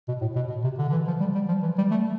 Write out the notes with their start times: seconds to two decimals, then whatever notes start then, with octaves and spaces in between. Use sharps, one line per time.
0.08 B2
0.21 A2
0.36 B2
0.50 B2
0.64 C3
0.79 D3
0.89 D3
0.92 E3
1.07 F3
1.20 G3
1.35 G3
1.48 F3
1.63 E3
1.78 G3
1.91 A3